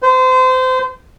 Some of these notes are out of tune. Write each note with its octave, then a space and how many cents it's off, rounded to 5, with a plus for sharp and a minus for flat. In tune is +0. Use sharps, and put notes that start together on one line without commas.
C5 -30